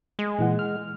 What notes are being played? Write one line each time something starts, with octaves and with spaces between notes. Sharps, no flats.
G#3
A#2 E3 F#5
F6